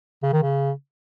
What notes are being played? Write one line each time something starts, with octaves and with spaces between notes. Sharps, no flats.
C#3
D#3
C#3